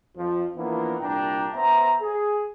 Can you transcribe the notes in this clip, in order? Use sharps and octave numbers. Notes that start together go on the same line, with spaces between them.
F2 F3
E3 F3 A#3 B3 D4 E4
C2 A#2 D4 G5 A#5
B3 C5 E5 A#5
G#4